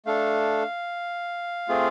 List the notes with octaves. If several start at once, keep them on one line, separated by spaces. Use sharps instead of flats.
A3 D4 A4 F5
A3 C4 F4 G#4